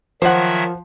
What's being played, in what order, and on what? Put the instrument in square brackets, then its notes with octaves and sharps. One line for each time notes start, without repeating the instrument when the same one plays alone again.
[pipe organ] D#3 F#3 E5 [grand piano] F3 [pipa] C5 F#5